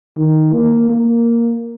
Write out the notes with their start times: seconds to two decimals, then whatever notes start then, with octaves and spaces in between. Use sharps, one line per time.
0.17 D#3
0.53 A#3
0.90 A#3